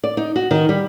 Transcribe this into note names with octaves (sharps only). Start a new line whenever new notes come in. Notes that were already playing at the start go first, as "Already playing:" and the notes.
D5
D#4
F#4
D#3
G3